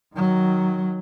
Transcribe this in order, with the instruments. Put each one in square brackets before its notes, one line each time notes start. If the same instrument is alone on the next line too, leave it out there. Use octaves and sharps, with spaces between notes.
[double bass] D#3 F#3